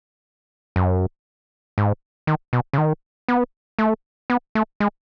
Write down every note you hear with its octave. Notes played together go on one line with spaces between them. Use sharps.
F#2
G#2
D#3
B2
C#3
D#3
B3
A3
B3
A3
G#3